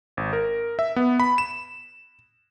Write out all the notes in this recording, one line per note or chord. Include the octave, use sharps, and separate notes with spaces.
G#1
A#4
E5
B3
B5
E7